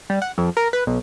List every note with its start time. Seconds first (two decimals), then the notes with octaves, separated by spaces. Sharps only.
0.10 G3
0.22 F#5
0.38 F2
0.57 A#4
0.73 B4
0.87 B1